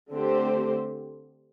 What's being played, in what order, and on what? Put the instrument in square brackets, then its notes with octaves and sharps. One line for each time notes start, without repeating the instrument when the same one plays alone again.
[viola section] D3 A3 C4 G4 C5